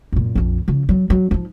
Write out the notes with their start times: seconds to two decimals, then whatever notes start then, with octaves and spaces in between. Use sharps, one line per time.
0.13 F#2 A#2
0.35 A#1 F2
0.68 C#3 F3
0.89 F#3
1.10 F#3
1.31 F3 D#4